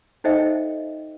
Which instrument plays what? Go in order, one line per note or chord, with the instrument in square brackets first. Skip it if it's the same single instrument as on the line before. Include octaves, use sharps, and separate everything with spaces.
[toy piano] D#4 A4 C5 D#5 E5 G5